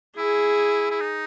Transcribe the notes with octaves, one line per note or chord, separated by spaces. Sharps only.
E4 G#4
E4
D#4